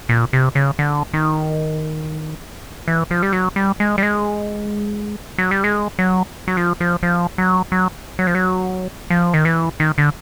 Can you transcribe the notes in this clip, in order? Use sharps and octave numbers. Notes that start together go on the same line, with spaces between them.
A#2
C3
C#3
D3
D#3
E3
F3
G3
F#3
G3
G#3
G3
G#3
F#3
G3
G#3
F#3
F#3
F3
F3
F3
F#3
F#3
F#3
F3
F#3
F3
D#3
E3
D#3
D3